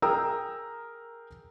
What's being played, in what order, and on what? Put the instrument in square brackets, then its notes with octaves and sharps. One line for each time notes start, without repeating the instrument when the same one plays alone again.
[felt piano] G#4 A#4 G5 A#5 D#6 E6